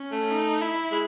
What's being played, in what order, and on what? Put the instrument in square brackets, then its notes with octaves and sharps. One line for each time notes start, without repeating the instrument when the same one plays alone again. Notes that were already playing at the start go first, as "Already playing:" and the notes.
Already playing: [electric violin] C#4
[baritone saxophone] A3
[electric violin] D#4
E4
[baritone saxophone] G#3